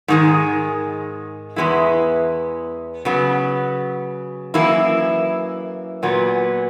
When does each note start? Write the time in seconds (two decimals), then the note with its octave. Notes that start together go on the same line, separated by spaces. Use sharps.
0.08 G#2 D#3 G#3
1.56 E2 C#3 G#3 B3 E4
3.05 C#3 F#3 B3
4.54 F#2 E3 A#3 E4
6.03 A#2 F#3 B3